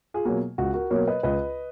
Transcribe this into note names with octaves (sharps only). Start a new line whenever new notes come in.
F4 G#4
B2 F#3 A#3
C#2 F#4
F#4 A#4
B2 F#3 A#3 A#4 C#5
B4 D#5
C#2 B4 D#5